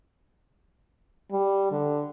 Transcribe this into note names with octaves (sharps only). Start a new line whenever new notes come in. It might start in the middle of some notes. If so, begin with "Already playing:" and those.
G3
D3